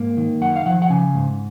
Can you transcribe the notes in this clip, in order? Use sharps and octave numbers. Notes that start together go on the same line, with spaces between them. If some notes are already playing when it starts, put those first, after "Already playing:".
Already playing: G#2 A#3
D#3
F#2 F#5
F5
F3 F#5
F#5
C#3 G#5
G#2